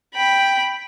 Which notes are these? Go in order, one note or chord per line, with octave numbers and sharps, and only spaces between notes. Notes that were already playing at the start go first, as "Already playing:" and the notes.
G5 B5